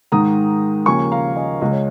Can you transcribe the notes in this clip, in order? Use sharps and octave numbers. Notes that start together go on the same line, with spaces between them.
G#2 D#3 G#3 A#5 D#6
D#2 C#3 F3 A#3 G#5 C#6
F5 A#5
D#5 G#5
C#2 C#3 G#3 D#5
C#5